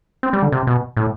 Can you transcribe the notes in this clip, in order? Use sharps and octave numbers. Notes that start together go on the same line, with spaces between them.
C4
G3
D3
C3
B2
A2